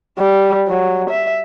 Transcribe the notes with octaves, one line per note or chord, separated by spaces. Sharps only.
G3
F#3
E5